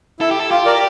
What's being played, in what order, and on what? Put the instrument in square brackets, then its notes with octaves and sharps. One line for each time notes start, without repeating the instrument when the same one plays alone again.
[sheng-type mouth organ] E4 [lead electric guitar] A4
[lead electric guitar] G4
A4
[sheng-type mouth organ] F4 [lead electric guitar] G4
[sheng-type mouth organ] A#4 D5